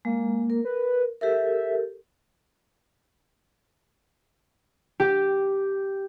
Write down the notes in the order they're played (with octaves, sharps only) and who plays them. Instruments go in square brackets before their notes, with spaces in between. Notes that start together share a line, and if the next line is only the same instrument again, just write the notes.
[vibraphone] G#3 [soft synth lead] A#3
[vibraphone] A#4
[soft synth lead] B4
[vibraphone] G4 A4 A#4 [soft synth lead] E5
[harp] G4